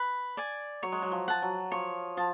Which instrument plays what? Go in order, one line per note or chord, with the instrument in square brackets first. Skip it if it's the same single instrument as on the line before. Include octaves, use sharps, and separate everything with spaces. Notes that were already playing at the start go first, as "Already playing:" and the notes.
Already playing: [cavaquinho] B4
D5 G#5
[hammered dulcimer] F#3 [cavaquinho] C#5
[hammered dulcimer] G#3
F#3
F3
[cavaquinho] F#5 A5
[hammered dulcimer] F#3
[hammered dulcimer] F3 [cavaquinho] C#5
[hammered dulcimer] F3 [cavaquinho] A5